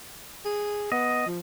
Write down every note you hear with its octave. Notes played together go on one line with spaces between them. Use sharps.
G#4
B3 D#5
F3